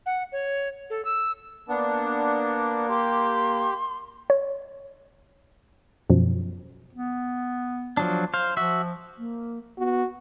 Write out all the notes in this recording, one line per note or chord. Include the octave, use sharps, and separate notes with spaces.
F#5
C#5
A4
E6
A#3 B3 D4
G4 C6
C#5
F#2 B2 F3
B3
F3 F#3 D4
C5 F5
F3 F#4 E5
A#3
B3 F#4